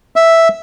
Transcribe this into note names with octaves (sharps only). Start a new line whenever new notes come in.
E5